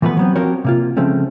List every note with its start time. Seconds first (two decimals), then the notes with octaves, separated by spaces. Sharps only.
0.02 E3 F3 A3 B3 B4
0.17 F#3 B3 C4
0.36 F3 C4 F#4 G4 A#4 C#5
0.65 C3 A#3 F4
0.97 C#3 F3 G#3 A3 C4 C#4